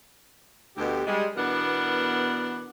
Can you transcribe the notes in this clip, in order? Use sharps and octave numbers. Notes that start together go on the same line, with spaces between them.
D2 B2 G4
G3 G#3
B2 E3 B3 D4 A#4 F#5